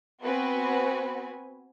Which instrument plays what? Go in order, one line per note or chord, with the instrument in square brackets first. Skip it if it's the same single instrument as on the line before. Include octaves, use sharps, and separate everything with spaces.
[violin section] B3 C4 F#4 B4 G#5